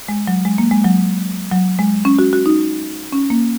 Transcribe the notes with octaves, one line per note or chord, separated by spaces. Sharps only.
G#3
F#3
G#3
A#3
G#3
F#3
F#3
G#3
C#4
F#4
F#4
D#4
C#4
A#3